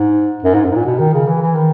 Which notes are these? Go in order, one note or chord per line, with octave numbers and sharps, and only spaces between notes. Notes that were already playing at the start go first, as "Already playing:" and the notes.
Already playing: G#2
F#2
G#2
F#2
G#2
A#2
B2
D#3
C#3
E3
E3
D#3